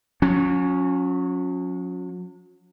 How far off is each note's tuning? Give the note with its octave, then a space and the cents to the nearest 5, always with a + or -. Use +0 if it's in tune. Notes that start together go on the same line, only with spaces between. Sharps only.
F#3 -40 C#4 +0